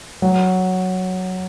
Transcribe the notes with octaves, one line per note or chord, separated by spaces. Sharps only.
F#3